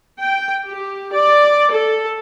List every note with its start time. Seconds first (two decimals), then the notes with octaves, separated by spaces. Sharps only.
0.19 G5
0.67 G4
1.12 D5
1.71 A4